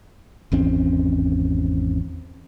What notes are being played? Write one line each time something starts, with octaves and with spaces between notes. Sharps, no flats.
G#1 E2 C4 C#4